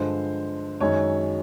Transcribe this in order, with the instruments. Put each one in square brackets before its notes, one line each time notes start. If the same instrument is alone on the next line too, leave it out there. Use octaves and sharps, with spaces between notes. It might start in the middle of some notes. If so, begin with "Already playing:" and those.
Already playing: [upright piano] G2 D3 F3 G#3 C5
F#2 D#3 G#3 C#5